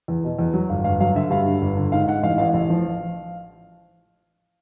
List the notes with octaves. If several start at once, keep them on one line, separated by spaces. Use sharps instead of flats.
E2
B2
E2
F#3
G1 F5
G1 F5
F#3 F5
D3 E5
G2 F5
D3
G1
D3
G#2 F5
G#2 F#5
A1 F5
A1 F5
A1
F3